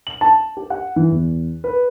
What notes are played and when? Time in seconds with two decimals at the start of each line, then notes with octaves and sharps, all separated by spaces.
0.07 F#7
0.21 A5
0.57 G4
0.70 F#5
0.96 E3
1.11 E2
1.64 B4